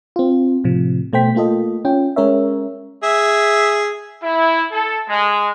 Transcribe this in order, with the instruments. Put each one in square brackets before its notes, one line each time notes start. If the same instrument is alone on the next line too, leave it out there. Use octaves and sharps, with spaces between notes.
[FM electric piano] C4 F4
A2 C3 F3
B2 A3 C5 G5 B6
A3 A#3 F4 A4 D#5
C#4 F4 G5
G#3 C#4 A#4 C#5 E5
[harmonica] G#4 E5
[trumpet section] E4
A4
G#3